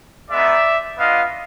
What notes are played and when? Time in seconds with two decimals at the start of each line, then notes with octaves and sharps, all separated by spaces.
0.31 G#3 B3 D#4 D5 E5
0.98 B3 D4 F4 D#5 F5